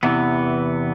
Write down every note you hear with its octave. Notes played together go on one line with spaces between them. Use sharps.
E2 C3 E3 B3